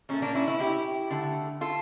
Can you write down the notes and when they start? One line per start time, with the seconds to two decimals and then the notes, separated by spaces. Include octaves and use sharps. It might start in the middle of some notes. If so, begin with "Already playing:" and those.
0.09 A#2 A3 C#4
0.22 A#3 D4
0.35 C#4 E4
0.48 C#4 E4
0.60 E4 G4
1.11 D3 A3
1.61 F4 A4